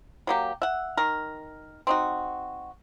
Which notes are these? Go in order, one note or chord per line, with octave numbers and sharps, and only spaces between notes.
F#3 A#3 G4
E5 F#5
D#3 A#4
C4 D#4 F#4